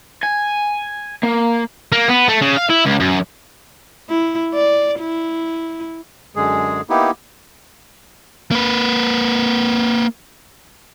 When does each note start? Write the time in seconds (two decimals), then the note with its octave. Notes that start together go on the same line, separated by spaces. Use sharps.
0.23 G#5
1.23 A#3
1.92 A#3
2.08 B3
2.29 A3
2.42 C#3
2.57 F5
2.70 E4
2.86 C#2
3.00 F#2
4.09 E4
4.54 D5
5.00 E4
6.36 F#2 D3 G#3 G#4
6.90 A#3 B3 D#4 E4 G4
8.51 A#3 B4